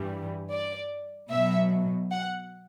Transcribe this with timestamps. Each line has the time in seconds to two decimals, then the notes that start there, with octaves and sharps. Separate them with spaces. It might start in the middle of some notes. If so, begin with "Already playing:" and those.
Already playing: G2 E3 G3
0.50 D5
1.30 B2 F#3 E5
2.11 F#5